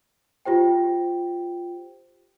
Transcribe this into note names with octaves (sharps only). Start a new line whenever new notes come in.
F4 G4 C5 G5